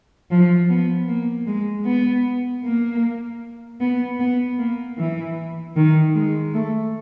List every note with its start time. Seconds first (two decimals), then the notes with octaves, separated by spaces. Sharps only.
0.31 F3
0.70 B3
1.08 A#3
1.47 G#3
1.86 B3
2.64 A#3
3.81 B3
4.20 B3
4.59 A#3
4.98 E3
5.76 D#3
6.15 G#3
6.54 A3